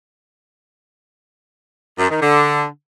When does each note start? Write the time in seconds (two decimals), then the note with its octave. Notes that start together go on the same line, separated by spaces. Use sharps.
1.98 F#2
2.10 D#3
2.22 D3